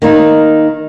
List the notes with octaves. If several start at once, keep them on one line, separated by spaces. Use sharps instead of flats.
D#3 A#3 D#4